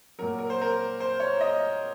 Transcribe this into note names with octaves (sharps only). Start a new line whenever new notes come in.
A#2 F#3 A#4
A#4
C5
A#4
C5
C#5
D#5